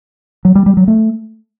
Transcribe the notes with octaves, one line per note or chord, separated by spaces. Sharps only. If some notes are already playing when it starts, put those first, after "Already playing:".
F#3
G3
G3
F#3
A3